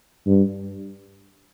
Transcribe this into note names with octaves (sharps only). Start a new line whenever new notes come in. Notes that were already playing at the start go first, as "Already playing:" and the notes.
G2